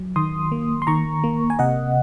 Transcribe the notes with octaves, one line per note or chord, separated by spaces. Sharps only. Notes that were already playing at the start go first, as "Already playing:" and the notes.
Already playing: F#3
D#3 C6 D#6
A#3
C6
D#3 A#5 C#6
A#3
G#5
C3 D#5 F#5